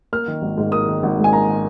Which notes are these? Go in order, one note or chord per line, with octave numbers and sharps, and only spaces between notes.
A#3 F6
D#3
G#1
G#2
A#3 D#6
D#3
G#1
G#2
G#5
A#3 A#5
D#3